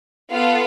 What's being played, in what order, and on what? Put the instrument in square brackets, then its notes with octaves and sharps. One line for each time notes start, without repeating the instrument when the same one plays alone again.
[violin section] B3 F4 A4 F5